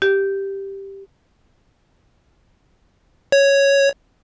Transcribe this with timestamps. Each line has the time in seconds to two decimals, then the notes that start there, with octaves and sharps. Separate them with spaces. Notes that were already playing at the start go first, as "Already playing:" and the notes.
0.02 G4
3.32 C#5